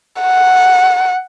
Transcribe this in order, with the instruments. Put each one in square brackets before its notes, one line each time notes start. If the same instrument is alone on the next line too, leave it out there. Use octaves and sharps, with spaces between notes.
[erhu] F#5